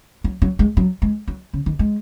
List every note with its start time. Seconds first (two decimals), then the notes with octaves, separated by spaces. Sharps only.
0.24 F#3
0.42 F#3
0.59 G#3
0.77 F#3
1.02 G#3
1.28 F#3
1.53 C#3
1.66 D#3
1.79 G#3